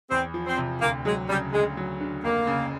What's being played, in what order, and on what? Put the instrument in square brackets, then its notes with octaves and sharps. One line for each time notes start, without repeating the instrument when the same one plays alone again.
[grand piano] E2 [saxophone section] C4
[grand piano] F3
[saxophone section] C4
[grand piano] C3
[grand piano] D2 [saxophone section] A#3
[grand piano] F#3 [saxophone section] G#3
[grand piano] C#3 [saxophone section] G3
[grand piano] D2 [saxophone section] G#3
[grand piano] F#3
D3
[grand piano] F1 [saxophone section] A#3
[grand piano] C#3